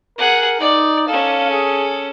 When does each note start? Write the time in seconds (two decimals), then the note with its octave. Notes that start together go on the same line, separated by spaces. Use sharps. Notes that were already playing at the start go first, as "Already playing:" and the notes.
0.18 G#4 A#4 F#5
0.60 D#4 D5
1.08 C#4 A4 F5
1.50 G#4